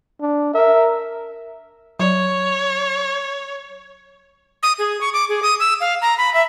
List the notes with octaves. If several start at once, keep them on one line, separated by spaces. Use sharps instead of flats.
D4
A#4 E5
F#3 C#5 D5
D#6
G#4
C#6
D6
G#4
D#6
E6
F5
A#5
B5
E5